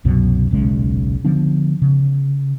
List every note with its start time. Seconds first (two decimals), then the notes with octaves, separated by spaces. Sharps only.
0.05 C2 F#2 B2 F#3
0.51 D#1 B1 C#3 G#3
1.25 D3 F3 B3 D4
1.82 C#3